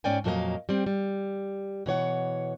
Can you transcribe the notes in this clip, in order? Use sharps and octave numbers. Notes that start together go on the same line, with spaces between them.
G#2 C#4 D5 G5 G#5
F2 A#2 F#3 A#3 D#5 F5
G3 C4
G3
B2 E3 C#5 F#5